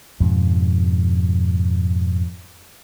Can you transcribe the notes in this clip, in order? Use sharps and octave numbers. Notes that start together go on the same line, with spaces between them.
F2 G#2 B2